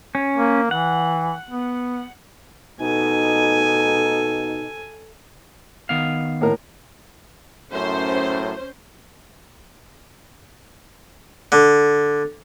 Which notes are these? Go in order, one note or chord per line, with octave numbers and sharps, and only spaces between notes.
C#4
A#3
E3 F#5
B3
B2 D#4 A4 G#5
D#3 B3 F5
A2 A#4
F#2 A2 C#4 C5
D3